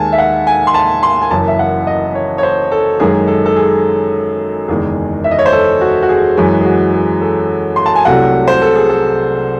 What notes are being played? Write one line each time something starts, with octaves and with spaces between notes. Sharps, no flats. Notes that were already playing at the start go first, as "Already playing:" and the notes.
Already playing: D#2 D#3 G#3 G#5 A5
E5
F#5
G#5
C6
A5
C6
G#5
F#1 F#2 E3 A5
E5
F#5
D#5
C#5
C#5
C5
A4
F#2 D#3 G#3 G#4
A4
A4
G#4
F#1 E2 D#3 G#3 G#4
E5
D#5
C#5
C5
A4
F#4
F#4
G#4
F#2 E3 G#3 F#4
G#4
F#4
G#4
A4
C6
A5
G#5
C2 C3 F#3 A3 F#5
C5
A4
G#4
A4